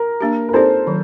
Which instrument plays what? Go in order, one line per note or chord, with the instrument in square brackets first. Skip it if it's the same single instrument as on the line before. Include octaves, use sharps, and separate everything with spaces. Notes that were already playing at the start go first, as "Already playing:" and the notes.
Already playing: [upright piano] A#4
[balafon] A#3 D4 G4
[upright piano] A#4
[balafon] C4 D#4 G4 D5 [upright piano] A4 C5
[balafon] D#3 F#3